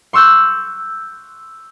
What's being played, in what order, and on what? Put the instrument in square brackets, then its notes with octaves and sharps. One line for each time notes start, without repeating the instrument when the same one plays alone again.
[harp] C6 C#6 E6 F#6 G6